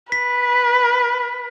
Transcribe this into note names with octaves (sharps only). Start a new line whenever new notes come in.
B4 B6